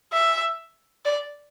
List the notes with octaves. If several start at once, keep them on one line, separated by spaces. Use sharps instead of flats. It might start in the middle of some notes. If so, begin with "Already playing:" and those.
E5
D5